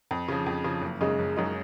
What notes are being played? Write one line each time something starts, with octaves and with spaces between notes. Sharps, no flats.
F2
C#3 F3
F2
C#3 F3
F#1
F#2 C#3 G#3 D#4
F#1
F#2 C#3 G#3 D#4